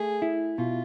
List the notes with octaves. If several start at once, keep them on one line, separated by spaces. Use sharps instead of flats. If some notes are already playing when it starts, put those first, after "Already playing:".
Already playing: A3 G#4
E4
B2 F4